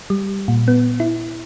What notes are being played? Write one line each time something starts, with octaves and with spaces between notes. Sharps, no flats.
G3
A#2
B3
E4